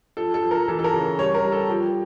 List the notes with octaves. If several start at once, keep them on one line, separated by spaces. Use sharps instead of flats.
F3 A4
A4
F3
A#4
E3 A4
A4
A#4
C#3
G3 C#5
A#4
G3
A4
F3 G4